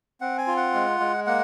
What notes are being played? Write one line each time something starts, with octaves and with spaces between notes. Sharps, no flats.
C4 F#5
G#5
F4
F#5
G#3
G#3
A#3 F#5